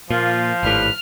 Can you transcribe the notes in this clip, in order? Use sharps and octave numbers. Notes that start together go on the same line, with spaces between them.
A#2 F3 A#3 F4
G#1 A2 D4 G4 B4 F6